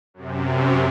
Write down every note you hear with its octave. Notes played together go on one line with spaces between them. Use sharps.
F#2 C3